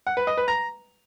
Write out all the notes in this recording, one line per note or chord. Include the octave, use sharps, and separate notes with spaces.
F#5
B4
D#5
B4
A#5